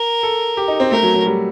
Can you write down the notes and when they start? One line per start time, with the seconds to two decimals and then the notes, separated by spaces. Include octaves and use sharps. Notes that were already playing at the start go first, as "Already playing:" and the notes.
Already playing: A#4
0.23 A4
0.57 G4
0.68 D#4
0.80 C4
0.91 A3 A#4
1.03 F#3
1.14 F#3
1.26 G3